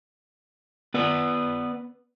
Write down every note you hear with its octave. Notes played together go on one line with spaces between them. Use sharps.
B3 B4 D5